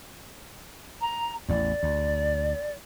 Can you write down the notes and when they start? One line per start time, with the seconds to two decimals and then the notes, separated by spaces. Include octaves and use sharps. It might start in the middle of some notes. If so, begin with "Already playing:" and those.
1.01 A#5
1.49 A1 E2 D5
1.83 D2